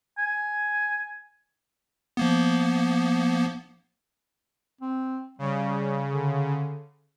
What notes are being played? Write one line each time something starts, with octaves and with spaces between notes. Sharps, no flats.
G#5
F3 A#3 B3
C4
C#3 G3
D3